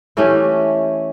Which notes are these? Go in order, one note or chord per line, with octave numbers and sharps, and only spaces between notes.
E3 A3 C#4 G4